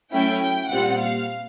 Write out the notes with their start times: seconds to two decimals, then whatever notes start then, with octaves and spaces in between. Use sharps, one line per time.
0.12 F#3 A3 C#4 E4 G5
0.42 G5
0.70 A#2 G3 C4 F4 F#5
0.99 F5